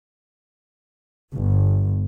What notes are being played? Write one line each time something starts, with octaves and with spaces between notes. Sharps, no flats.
G1